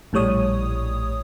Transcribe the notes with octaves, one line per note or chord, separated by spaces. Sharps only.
A#1 A2 G3 C#5 D#6